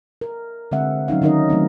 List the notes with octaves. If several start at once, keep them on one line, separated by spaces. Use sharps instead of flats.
A#4
D3 G#3 C4 E5 F#5
F#3 C#4 D#4 F5
D#3 C#4 D#4 A#4 D#5
F#3 A3 C4 D4